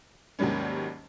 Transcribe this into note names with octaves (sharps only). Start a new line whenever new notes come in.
D#2 G#2 D#3 F#3 G3 C#4